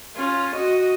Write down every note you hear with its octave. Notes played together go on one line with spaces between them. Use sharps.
C#4 F4
F#4 D#5